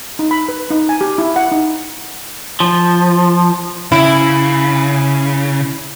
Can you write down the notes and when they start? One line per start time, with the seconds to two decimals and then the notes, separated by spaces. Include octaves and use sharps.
0.19 D#4
0.31 B5
0.49 B4
0.70 D#4
0.89 G#5
1.01 G4
1.18 E4
1.36 F#5
1.52 D#4
2.60 F3
3.92 C#3 E4